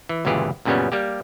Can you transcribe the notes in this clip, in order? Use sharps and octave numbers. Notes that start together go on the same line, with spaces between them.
E3
G1 C#2 A#2 E3 G4 G#4
F#2 A#2 C#3 G3 B3 C#4
G3 A#3 G4